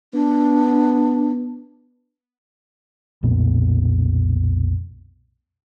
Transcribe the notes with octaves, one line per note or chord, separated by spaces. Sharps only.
B3 D4
B1 F2 A#2 B3